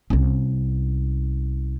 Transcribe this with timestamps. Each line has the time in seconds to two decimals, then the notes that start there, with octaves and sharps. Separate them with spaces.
0.10 C2 C#4